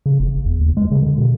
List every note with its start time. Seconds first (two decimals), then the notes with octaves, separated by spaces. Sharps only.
0.06 C#3
0.20 F#1
0.46 E2
0.61 D#2
0.77 G#3
0.91 C#3
1.03 D3
1.18 B2